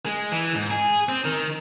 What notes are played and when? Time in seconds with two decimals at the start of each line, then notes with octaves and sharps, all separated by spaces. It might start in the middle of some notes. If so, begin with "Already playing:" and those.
0.06 G#3
0.32 E3
0.55 G#2
0.71 G#4
1.09 C4
1.25 D#3